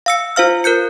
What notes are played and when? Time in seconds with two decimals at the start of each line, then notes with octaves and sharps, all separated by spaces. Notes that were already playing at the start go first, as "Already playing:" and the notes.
0.06 F5 E6 C#7
0.36 F4 C5 F5 F6
0.64 A#4 F#6 G6 C#7